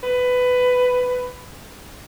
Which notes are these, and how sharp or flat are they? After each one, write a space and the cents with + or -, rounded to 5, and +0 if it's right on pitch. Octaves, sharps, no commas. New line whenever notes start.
B4 +15